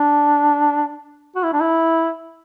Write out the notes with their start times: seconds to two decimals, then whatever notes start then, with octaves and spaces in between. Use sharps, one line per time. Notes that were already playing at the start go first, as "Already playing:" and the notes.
Already playing: D4
1.36 F#4
1.44 E4
1.53 D4
1.61 E4